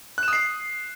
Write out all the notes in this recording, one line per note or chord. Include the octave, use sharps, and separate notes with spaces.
D#6 F#6 C7 E7